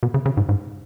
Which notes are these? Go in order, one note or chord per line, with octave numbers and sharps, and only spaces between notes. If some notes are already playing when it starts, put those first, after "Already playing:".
B2
C#3
C#3
G#2
G#2